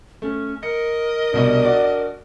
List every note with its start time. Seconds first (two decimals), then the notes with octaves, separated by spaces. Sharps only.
0.22 A3 C#4
0.63 A#4 D#5 C#7
1.33 C2 B2 D4
1.65 F#4 D5